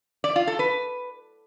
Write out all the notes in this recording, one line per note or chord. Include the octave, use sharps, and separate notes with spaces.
D5
F4
A4
B4